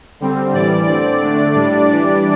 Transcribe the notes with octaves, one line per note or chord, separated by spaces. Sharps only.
D3 G3 C4
A2 E3 G3 D5
D3 C4 D5
D3 A3 D4
A2 G3 D4
E3 G3 D4